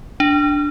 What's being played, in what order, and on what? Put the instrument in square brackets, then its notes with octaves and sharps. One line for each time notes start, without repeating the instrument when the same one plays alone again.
[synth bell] D4